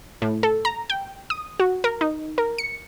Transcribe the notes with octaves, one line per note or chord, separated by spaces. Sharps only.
A2
A4
A#5
G5
D#6
F#4
A#4
D#4
A#4
C#7